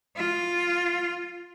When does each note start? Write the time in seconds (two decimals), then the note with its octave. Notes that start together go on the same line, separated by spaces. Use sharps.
0.16 F4